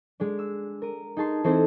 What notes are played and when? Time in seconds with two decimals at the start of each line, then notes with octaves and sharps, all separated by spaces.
0.20 G#3 D4
0.39 E6
0.82 A#4 D#7
1.17 D#4 G#4 A5 C6
1.44 E3 C4 D#4 E4 A4 C5